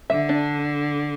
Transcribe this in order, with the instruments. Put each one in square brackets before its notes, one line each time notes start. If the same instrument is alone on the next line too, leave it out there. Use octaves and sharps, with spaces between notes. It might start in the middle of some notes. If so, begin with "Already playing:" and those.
[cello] D3 [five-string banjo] E5
[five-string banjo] D4